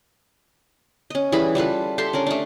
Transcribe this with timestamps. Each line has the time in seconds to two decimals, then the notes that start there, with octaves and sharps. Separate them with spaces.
1.10 C#4 D#5
1.32 E3 G3 G#4 B5
1.55 G3 F4 A4 B4
1.98 G4 A4 E5 C6
2.13 C#4 D4 A#4
2.27 A3 D4